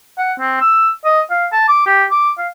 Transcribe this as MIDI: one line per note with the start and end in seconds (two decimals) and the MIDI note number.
0.18 0.33 78
0.40 0.59 60
0.61 0.89 88
1.05 1.21 75
1.31 1.46 77
1.52 1.66 81
1.68 1.83 86
1.86 2.04 67
2.11 2.31 86
2.38 2.47 77